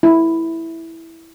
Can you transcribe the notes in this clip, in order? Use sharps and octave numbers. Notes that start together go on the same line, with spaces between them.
E4